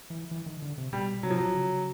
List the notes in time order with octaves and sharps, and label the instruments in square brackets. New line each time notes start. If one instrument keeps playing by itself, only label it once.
[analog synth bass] E3
E3
D#3
D3
C3
[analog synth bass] B2 [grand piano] G3
[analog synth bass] C3 [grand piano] F#3
[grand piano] F3
F#3
[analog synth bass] C#3